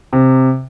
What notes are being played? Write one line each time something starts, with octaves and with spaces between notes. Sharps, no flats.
C3